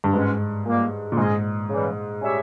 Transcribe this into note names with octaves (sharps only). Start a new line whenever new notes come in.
G2
G#2 B2 G#3 C#4
A#2 G3 A#3
A#2
G#2 G#3 C#4 G#4 D#5
C#3 E3 G3
G3 C#4 G4 C#5 E5